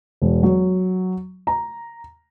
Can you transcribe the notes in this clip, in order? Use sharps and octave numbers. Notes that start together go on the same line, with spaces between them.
E1
F#3
A#5